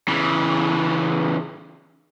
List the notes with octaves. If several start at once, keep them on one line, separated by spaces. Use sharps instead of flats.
C#3 E3